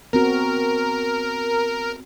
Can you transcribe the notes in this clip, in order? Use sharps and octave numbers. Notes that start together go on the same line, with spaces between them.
B3 C4 F#4 A#4